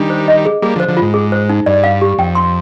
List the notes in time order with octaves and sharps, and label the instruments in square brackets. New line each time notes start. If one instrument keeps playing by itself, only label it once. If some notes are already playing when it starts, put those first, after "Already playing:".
Already playing: [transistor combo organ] D#3 G3 [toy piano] D4
[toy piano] C5
D#5
G#4
[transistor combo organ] G3 A#3 [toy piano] G#4
[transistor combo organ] D3 F3
[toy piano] C5
[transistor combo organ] D3 F3
[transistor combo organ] G#2 [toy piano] F4
[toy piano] G#4
C5
D#4
[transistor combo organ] G2 [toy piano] D5
[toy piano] F5
G4
[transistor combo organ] F2 [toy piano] G5
[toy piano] C6